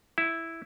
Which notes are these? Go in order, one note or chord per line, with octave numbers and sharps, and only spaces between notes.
E4